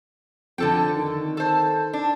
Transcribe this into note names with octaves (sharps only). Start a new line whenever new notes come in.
F2 D3 A4 G5
D#3
A4 C5
D4